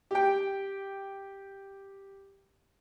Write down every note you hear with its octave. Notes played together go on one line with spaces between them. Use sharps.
G4 G5